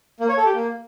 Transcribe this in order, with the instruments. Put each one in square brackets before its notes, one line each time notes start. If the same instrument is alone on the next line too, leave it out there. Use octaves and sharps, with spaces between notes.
[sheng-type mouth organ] A#3
C#5
A4
G4
A#3